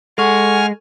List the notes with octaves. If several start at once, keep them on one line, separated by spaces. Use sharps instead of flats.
G#3 A4 F#5 G#5 C#6 F6